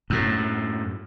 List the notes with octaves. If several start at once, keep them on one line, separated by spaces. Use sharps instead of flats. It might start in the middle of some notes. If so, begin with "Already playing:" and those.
F#2 A2